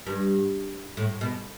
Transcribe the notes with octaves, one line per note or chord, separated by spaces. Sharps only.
G2
A2
B2